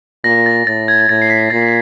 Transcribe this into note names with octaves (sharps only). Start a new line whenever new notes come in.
A#2 A#6
A6
A2 A6
G#6
A2 A6
C7
B6
A#2 A6